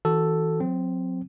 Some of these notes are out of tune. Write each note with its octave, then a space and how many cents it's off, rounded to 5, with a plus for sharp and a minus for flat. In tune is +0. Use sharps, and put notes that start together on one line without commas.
E3 -30 F#4 +10 A4 +0
F#3 -30 C4 -5